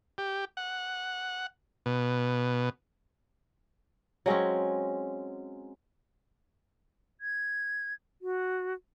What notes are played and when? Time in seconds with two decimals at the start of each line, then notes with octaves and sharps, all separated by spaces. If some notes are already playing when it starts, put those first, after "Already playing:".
0.18 G4
0.57 F#5
1.86 B2
4.26 F#3 G#3 C4 C#4
7.21 G#6
8.22 F#4